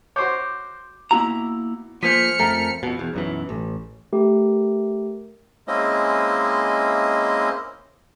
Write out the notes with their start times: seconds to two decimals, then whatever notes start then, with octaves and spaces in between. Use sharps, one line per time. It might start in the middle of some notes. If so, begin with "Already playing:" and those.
0.16 F#4 C5 C#5 D6 G6
1.11 B2 A#3 E4 A#5
2.03 F3 A#3 C5 G#5 F6 B6 C#7
2.39 F2 A3 A#4
2.83 F2 B2
2.99 E2
3.14 B1 F#2 E3
3.49 A1
4.13 A3 G4 A#4
5.68 G#3 A#3 C4 C#4 E4 D#5